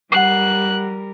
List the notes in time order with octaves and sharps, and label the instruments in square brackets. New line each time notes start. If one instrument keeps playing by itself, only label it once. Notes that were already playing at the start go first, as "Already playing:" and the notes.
[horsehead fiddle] G3 A#4 [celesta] F#5 C7 [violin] F#6